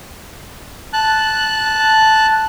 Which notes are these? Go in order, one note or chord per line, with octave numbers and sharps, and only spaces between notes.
A5 F#6